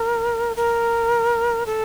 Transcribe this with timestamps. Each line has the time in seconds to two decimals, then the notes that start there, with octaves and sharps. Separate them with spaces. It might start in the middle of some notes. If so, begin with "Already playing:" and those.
Already playing: A#4
0.56 A#4
1.66 A4